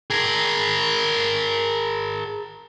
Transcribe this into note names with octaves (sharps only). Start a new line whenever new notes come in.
G#4 A#4